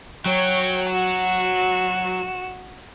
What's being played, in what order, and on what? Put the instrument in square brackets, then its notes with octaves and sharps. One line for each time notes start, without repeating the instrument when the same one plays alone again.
[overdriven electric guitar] F#3 [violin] C#5 G5
[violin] F#4 E7